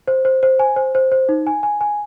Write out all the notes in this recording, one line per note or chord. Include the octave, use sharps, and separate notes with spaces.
C5
C5
C5
G#5
C5
C5
C5
D#4
G#5
G#5
G#5